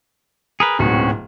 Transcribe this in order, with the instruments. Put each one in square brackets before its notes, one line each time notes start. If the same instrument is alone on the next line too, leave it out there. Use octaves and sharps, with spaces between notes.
[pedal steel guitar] G#4 A#4 B4
[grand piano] D1 G#2 B2 [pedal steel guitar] C4 C#4 F#4